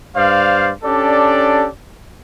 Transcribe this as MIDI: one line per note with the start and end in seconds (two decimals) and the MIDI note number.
0.16 0.71 43
0.16 0.71 72
0.16 0.71 74
0.16 0.71 77
0.83 1.68 61
0.83 1.68 62
0.83 1.68 67
0.83 1.68 69
0.83 1.68 74